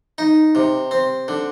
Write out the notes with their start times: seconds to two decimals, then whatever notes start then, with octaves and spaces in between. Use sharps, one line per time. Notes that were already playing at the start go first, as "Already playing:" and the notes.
0.18 D#4
0.55 C3
0.91 C4
1.28 D3